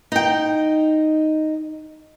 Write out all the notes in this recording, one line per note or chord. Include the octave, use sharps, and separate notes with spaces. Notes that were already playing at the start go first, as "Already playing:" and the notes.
D#4 G5